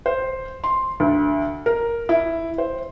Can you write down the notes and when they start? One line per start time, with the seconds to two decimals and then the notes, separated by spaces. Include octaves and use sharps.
0.06 C5
0.64 C6
1.00 D2
1.66 A#4
2.09 E4
2.58 C5